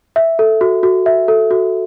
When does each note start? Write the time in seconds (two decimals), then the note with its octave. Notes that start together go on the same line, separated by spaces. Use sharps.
0.16 E5
0.39 A4
0.61 F#4
0.83 F#4
1.06 E5
1.28 A4
1.51 F#4